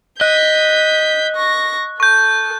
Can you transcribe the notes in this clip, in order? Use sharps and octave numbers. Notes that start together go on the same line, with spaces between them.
D#5 F#6 G6 B6
C#6 A#6
A4 C#6 G6